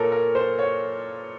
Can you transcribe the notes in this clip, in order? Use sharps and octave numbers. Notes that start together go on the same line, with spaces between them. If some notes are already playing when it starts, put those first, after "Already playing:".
Already playing: A#2 A4 A#4 C#5
A#4
C5
C#5